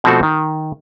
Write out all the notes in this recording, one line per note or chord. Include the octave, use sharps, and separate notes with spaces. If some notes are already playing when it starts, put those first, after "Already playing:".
B2 F3 A3 C4 F#4 A4
D#3